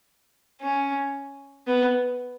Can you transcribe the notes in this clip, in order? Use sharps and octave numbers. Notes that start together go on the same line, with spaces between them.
C#4
B3